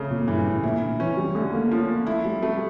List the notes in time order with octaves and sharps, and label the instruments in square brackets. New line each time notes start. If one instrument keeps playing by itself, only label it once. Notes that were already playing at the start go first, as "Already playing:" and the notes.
Already playing: [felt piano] C#3 A3
[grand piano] A#2
[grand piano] G2 [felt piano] E3
[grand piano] A2
[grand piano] A#2 [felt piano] E4
[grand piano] D3
[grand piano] E3 [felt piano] C#4
[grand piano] G3
[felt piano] D3 [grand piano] A3
[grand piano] A#3
A#3
[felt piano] F3 [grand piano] C#4
[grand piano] A#3
[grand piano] A3 [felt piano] E4
[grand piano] G3
[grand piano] G3 [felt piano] A3